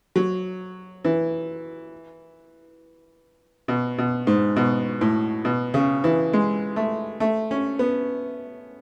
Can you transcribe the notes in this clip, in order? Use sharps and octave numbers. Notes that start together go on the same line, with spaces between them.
F#3
E3
B2
B2
G#2
B2
A2
B2
C#3
E3
G#3
A3
A3
C#4
B3